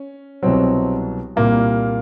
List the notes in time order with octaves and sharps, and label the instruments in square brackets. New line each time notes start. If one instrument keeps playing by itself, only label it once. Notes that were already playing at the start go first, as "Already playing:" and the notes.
Already playing: [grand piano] C#4
C2 B2 F#3 C4
C2 A#2 G3 A#3